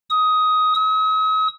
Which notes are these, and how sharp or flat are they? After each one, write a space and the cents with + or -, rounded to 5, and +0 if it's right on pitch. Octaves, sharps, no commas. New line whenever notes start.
D#6 +15
D#6 +45